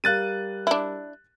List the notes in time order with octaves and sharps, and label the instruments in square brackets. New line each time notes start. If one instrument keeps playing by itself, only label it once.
[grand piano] G3 A#4 F5 [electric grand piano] F#6 A6 D#7
[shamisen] D4 E4